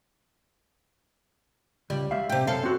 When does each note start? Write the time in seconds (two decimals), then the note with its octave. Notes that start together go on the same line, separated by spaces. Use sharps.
1.90 C#2 G3
2.11 G#3 E5 F5
2.30 C3 G4
2.47 F#2 A4 F5
2.64 C4 F#4